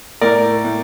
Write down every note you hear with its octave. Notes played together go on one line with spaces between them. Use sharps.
A2 A#4 D5
A2